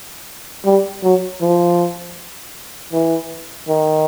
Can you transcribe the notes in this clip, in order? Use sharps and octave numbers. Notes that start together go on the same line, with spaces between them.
G3
F#3
F3
E3
D#3